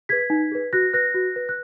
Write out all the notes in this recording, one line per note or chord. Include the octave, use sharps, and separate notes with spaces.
G#4 B4 G#6 B6
D#4
G#4 B4
F#4 F#6 A#6
B4 F#6 A#6
F#4
B4
F#6